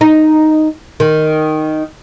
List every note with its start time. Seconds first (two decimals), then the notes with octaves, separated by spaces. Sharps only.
0.01 D#4
1.00 D#3